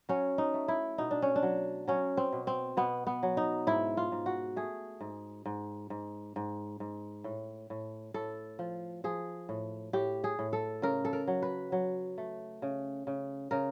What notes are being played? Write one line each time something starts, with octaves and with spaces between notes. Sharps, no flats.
F#3 C#4
D#4
A3
E4
B2 D#4
D4
C#4
D4
F#3
F#3 C#4
C4
B2
C4
B2 B3
B3
F#3
D#4
G#2 E4
F4
G#2
F#4
A3 G#4
G#2
G#2
G#2
G#2
G#2
A2
A2
A2 A4
F3
F3 G#4
A2
A2 G4
G#4
A2
A4
C#3 A#4
A4
A#4
F#3
B4
F#3
A3
C#3
C#3
C#3 A#4